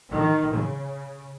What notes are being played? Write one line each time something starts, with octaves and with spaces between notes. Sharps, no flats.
D#3
C#3